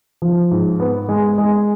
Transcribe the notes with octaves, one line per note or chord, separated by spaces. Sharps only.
F3
G#2
B3
G#3
G#3